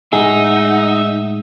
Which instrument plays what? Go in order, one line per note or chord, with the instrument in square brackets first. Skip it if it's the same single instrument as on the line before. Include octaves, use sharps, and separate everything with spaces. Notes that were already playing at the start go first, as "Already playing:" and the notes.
[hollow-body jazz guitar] A2 G#3 G#4 [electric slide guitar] D#4 [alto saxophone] E5 [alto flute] F#5